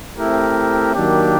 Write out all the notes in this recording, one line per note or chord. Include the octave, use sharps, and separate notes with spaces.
A3 C4 E4 G4 A#4
D#3 F#3 A#3 D4 G4